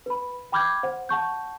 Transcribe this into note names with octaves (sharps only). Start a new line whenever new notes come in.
B4 B5
G5 B5 D6 F6 G6 G#6
C5 F#5
F#5 A5 C#6 G6